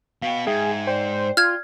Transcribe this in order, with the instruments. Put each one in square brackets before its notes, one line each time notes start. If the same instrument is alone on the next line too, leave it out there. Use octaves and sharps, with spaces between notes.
[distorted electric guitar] B2 B3 [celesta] F5 G5
[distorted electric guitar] G#2 [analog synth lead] G#4 [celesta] E5 G5 G#6
[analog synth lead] C5 [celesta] D5 G5
[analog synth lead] F4 [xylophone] F6 G#6